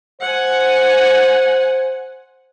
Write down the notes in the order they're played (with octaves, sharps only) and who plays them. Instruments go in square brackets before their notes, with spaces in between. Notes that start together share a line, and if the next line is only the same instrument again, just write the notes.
[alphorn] C5 [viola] F#5 G#5